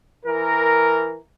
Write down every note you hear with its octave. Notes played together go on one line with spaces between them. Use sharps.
E3 A#4